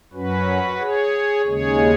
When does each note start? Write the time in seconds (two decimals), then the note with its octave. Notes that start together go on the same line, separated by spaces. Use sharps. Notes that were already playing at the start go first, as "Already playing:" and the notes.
0.13 F#2 F#3 C#4 F#4 B4
0.79 G#4 C#5
1.45 D#2 C#3 G#3 G#4 C#5